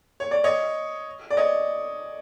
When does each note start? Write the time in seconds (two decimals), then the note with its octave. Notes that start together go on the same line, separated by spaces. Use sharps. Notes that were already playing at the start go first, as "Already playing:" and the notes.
0.20 C#5
0.31 D5
0.44 C#5 D#5
1.30 D5
1.37 C#5 D#5